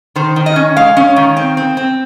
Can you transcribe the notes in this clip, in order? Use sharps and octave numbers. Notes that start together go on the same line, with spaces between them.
D#3 C5
D#3
D#5
C#4
G#3 F5
C#4
D#3
C4
C4
C4